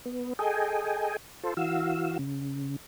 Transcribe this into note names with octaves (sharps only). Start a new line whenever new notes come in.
B3
G#4 A4 D#5 G5 G#5
F4 A4 C5
E3 F#4 F5 E6
C#3